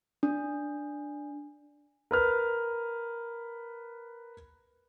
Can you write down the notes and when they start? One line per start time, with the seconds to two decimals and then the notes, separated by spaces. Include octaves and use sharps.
0.23 D4
2.11 A#4 B4 F6